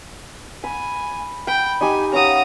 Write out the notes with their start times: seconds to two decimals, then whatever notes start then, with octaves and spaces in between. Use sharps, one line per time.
0.64 G#5 B5
1.47 G5 B5
1.81 D#4 G4 G#5
2.13 C#4 F5 F#5 A#5 D#6